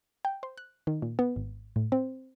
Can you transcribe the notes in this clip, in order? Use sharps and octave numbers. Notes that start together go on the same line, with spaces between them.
G5
C5
F#6
D#3
A#2
B3
G#1
A2
C4